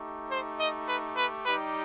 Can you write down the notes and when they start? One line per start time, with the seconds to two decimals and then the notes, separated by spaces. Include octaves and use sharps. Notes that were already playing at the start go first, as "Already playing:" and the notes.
Already playing: A3 D#4 G4
0.32 C5
0.60 D#5
0.88 B4
1.17 B4
1.46 G3 D#4 G4 B4